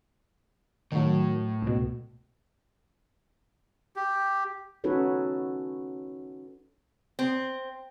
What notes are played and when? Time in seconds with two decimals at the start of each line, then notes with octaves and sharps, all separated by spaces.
0.92 A2 D#3 F#3
1.62 C#2 B2
3.96 G4
4.84 C#4 D#4 F#4 A4 B4 C#5
7.19 C4